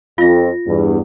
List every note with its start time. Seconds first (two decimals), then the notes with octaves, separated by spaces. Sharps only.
0.18 F2 F4 A#6
0.67 E2 G2